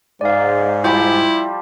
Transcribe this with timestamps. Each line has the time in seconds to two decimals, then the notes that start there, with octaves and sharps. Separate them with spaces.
0.21 G#2 D5 F5
0.84 F3 G3 E4 G4 G6